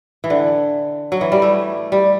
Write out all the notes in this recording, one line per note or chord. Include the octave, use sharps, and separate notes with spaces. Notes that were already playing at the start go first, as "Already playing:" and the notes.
E3
D3
F#3
E3
G3
A3
G3